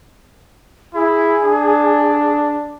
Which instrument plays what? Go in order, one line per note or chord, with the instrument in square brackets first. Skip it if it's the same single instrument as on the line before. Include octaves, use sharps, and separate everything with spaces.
[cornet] E4 [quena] G#4
[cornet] D4